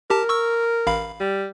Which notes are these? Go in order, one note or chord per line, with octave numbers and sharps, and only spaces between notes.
G4 A#4 A5
C#6 E6
A1 F5 B5
G3